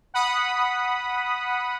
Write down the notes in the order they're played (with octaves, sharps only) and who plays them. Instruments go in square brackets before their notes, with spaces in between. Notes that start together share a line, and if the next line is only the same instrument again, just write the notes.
[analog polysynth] F#5 B5 D#6